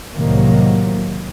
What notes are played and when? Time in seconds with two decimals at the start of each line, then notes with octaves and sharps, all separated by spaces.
0.14 C2 A2 C3 D#3 F#3 A#3